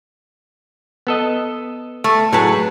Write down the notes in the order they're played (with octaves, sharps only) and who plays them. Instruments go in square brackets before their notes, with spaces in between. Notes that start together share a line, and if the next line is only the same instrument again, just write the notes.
[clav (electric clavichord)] B3 A4 D#5
[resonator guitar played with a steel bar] A3
[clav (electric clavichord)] A2 A5 [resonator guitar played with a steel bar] F#3 G#4 B4